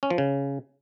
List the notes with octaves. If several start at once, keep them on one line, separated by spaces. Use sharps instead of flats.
C#4
F3
C#3